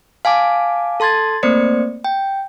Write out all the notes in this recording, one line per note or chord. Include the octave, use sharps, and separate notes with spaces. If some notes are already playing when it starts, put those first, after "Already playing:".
F5 G#5 A5 D6
A4 A5 C6 G#6 A6
A3 A#3 C4 C5 D5 C#7
G5